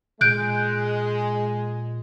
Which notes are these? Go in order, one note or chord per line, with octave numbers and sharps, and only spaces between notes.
A#2 G#3 F#6 G6 D7